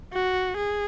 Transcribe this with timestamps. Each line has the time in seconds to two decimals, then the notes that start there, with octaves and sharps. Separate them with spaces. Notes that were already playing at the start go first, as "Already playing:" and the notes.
0.13 F#4
0.57 G#4